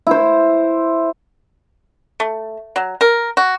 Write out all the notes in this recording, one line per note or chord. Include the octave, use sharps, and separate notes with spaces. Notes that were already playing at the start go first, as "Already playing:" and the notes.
E4 C5
A3
F#3
A#4
F#4